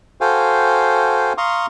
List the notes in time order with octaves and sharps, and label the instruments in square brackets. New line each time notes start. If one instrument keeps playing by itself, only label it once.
[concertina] F#4 A4 C5 F5 G5 G#5
F5 A#5 C6 C#6 D#6